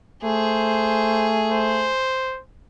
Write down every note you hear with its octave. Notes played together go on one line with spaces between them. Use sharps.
A3 G#4 C5
C5